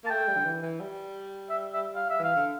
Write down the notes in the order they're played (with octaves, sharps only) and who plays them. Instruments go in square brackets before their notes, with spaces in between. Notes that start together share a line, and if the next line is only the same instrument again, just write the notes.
[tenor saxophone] A#3 [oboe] A5
[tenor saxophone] A3 [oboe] G5
[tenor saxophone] G3
D3
E3
E3
G3
[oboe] E5
E5
F5
E5
[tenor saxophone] E3 [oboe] F5
[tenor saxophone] D3